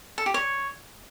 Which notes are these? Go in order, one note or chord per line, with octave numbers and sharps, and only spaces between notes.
A4
G4
C#5